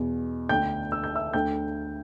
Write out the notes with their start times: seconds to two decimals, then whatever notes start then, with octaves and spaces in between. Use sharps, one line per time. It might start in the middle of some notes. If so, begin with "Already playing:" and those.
Already playing: E2 B2
0.49 D2 D3 G5 G6
0.92 E6
1.04 G6
1.15 E5 E6
1.33 D2 D3 G5 G6